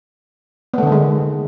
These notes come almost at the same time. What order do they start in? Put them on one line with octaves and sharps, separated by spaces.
B3 A3 D3 D#3 G#3